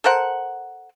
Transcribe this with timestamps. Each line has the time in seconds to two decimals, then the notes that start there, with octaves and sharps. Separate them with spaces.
0.04 A4 A#4 C5 F#5